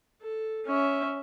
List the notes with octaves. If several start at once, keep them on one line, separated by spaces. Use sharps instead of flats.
A4
C#4 E5